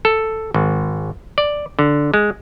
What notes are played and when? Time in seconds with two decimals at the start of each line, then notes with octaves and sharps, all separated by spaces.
0.05 A4
0.54 G#1
1.38 D5
1.79 D3
2.14 G#3